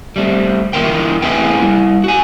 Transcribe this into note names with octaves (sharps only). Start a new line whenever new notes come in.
G3 A3 C4
E3 F3 E4 F4 A#4 G5
A3 C4 E4 G#4 B4 G5
G3 E4
F#4 G#5